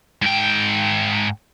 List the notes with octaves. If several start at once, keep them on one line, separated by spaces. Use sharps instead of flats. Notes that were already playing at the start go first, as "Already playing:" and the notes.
G#2 G5